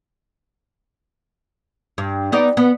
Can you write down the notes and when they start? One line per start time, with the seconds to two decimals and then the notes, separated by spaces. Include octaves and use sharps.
1.98 G2
2.32 B3 D#4 D5
2.57 B3